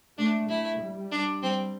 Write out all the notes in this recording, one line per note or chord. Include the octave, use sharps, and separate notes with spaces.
A3 D4
A3 E4
G3
D4
G3 C4